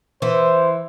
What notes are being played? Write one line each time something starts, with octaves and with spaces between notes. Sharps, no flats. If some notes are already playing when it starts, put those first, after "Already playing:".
E3 C5